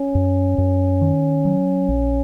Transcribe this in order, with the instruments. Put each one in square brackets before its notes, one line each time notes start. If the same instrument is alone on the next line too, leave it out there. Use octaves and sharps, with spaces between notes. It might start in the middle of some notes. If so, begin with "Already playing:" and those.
Already playing: [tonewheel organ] C#4
[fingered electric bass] F#2
F#2
D#3
F#3
A#1